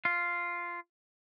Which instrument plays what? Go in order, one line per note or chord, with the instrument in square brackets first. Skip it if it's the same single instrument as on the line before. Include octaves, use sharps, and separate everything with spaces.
[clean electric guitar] F4